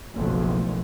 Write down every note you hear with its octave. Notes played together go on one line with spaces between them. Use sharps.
F#1 B1 F2 A3